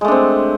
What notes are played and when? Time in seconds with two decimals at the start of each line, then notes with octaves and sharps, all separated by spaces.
0.01 G#3
0.05 A3
0.08 D4
0.11 C4